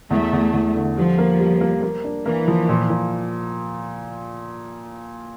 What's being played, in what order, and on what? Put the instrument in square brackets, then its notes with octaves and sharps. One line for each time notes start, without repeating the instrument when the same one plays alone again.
[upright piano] E2 [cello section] A3
[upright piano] E2
E2
D3
[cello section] F3 [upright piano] G3
[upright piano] A#3
G3
A#3
A#3
D4
[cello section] E3 [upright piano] A#3
[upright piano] F3
A#2
A#2